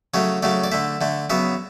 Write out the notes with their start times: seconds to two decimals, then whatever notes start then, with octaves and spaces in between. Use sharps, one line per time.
0.14 C#3 F#3 A3 C#5
0.43 C#3 F#3 A3 D5
0.64 D5
0.72 D3 A3 E5
1.01 D3 A3
1.30 C#3 F#3 B3 E5